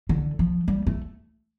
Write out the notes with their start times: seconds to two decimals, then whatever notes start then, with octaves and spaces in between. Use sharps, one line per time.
0.09 D3
0.39 F3
0.68 G3
0.87 A3